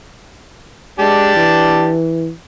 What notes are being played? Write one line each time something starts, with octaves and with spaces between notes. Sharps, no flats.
G#3 D4 G4 A5
E3